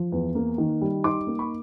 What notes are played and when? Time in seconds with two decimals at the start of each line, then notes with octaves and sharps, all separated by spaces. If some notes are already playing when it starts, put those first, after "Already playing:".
Already playing: F3
0.12 E2
0.35 A#3
0.58 D#3
0.82 G3
1.04 D#4 C6 D6
1.27 A#3
1.39 B5 C#6